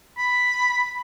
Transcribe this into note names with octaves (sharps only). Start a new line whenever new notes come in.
B5